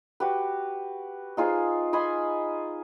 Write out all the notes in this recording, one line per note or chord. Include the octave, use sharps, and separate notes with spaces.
F#4 G4 B4
D#4 F4 G#4 C5
D#5 G#5 B5 C6